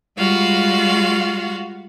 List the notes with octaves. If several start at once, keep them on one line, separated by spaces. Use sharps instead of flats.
G3 G#3 F4 F#4 F5